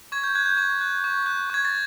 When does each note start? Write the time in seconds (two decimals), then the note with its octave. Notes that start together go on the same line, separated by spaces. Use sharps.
0.12 C#6 G#6
0.24 G6
0.35 F#6 G#6
0.46 G6
0.57 C#6 G#6
0.81 F#6
1.04 C#6
1.26 F#6
1.50 C#6 G#6
1.65 A6